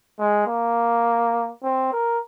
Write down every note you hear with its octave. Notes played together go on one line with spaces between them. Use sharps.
G#3
A#3
C4
A#4